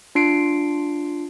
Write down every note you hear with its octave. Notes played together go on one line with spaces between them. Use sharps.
D4 F4 C7 D7